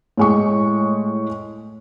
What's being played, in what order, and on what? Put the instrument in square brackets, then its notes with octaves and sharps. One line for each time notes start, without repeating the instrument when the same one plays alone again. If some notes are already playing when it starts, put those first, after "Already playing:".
[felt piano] A2 G#3 C#6